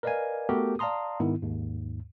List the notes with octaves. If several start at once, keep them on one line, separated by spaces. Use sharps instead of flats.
A#4 B4 D5 D#5 F5 G#5
A3 B3 F#4 G4 A4 A#4
D5 F5 A5 A#5 C6 D#6
G#2 D#3 B3 E4
D#2 G#2